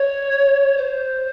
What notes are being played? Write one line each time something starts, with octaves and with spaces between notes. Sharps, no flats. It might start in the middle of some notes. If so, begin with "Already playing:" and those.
Already playing: C#5
C5